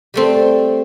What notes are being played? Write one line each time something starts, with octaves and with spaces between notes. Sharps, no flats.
G3 A3 C4